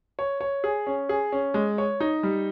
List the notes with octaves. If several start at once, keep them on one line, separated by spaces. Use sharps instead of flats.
C#5
C#5
G#4
C#4
G#4
C#4
G#3
C#5
D#4
G3